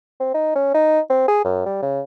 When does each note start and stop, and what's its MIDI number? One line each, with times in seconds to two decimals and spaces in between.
0.20 0.32 60
0.34 0.54 63
0.55 0.70 61
0.74 1.00 63
1.10 1.25 60
1.28 1.39 68
1.44 1.62 42
1.66 1.78 55
1.82 2.00 49